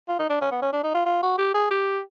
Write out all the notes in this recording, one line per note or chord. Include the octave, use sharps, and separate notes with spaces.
F4
D#4
D4
C#4
B3
C#4
D4
D#4
F4
F4
F#4
G4
G#4
G4